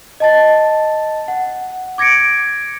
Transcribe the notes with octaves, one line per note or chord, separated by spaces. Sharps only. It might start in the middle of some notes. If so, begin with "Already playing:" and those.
D#5 A5 A6
F#5
D6 G#6 A#6 C#7 D7